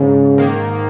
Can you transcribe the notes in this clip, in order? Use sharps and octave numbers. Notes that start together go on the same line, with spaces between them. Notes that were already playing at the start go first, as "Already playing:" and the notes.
Already playing: G#2 C#3
D#3 A#3